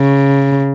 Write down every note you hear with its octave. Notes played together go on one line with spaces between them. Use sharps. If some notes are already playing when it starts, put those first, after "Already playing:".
Already playing: C#3